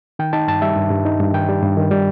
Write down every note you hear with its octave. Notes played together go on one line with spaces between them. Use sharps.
D#3 G5
D#4 A5
G2 A5
G3 E5
G2
G2
D#4
G2
D#3 G5
G3
G2
D#3
G3